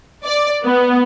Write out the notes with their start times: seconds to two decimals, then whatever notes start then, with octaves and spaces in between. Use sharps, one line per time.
0.24 D5
0.64 B3